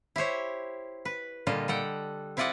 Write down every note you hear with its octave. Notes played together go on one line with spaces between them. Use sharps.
E4 G4 C5 C#5
B4
A#2 D3 G3 F4 D#5
G3 A4 F#5 G5
C4 E4 F4 D5 D#5 F#5